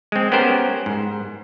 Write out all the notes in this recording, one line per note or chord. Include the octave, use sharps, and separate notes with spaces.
G#3 C4
B3 C#4 G4 A#4 C5
G#2